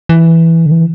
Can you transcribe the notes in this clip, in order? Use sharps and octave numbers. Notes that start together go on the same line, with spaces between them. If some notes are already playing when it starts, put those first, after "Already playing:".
E3
D3
E3